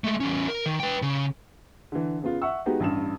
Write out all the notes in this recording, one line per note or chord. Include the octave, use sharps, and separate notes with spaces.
G#3 A3
E2 C#4
A#4
D#3
B4 G5
C#3
D3 E3
C#3 B3 F4
E5 F#5 C#6 E6
G#3 B3 D#4 F#4 G4
A1 G2 E7